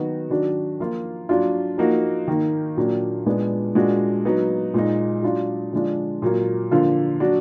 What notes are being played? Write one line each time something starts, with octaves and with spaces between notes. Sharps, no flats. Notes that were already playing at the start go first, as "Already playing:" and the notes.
Already playing: D#3 F#3 B3 D#4 F#4
D#3 F#3 D4 F#4
F3 A#3 F4
F#3 D4 F4
F3 A#3 D#4 F#4
D#3 A#3 D#4
A#2 F#3 A#3 D4
A#2 G#3 B3 D4
A#2 G#3 D4 F#4
F#3 B3 D#4
A#2 G#3 D#4
F#3 D4 F4
D3 F3 G#3 D4 F4
A#2 F#3 A#3
D3 F3 A#3 F4
F#3 D4 F#4